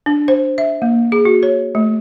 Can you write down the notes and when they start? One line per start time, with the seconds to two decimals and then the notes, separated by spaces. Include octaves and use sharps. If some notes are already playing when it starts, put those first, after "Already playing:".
0.06 D4
0.28 C5
0.58 E5
0.82 A#3
1.12 G#4
1.25 F#4
1.43 C#5
1.75 A3